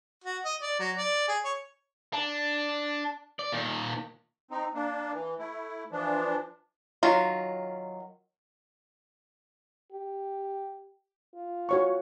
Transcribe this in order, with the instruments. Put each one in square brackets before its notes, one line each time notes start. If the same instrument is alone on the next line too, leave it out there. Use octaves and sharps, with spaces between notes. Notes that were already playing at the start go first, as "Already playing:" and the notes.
[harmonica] F#4
D#5
D5
F#3
D5
G#4
C#5
[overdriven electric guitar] D4
D5
A#2 D#3
[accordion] C4 D#4
A#3 D4
E3
A3 E4
E3 F3 D4
[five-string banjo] D#3 F#3 F4
[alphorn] G4
F4
[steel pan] F#4 C#5 C#6